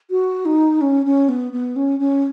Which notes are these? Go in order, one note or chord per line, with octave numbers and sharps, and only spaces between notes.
F#4
D#4
C#4
C#4
B3
B3
C#4
C#4